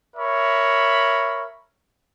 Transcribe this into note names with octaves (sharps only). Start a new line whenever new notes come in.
A#4 C#5 E5 B5